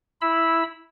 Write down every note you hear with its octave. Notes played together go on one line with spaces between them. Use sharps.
E4 B5 E6